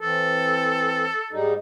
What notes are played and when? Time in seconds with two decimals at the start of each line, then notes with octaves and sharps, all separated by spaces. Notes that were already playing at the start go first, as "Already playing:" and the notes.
0.01 E3 C4 A4
1.32 G#2 G3 D#4